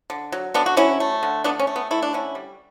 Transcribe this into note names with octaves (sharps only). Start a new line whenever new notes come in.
D3
F#3
D3 B3 D4
F#4
F#3 C#4 E4
A3
D3
A3 B3 D4
C#4
A3
B3
A3 E4
D4
D3 C#4 E4
G3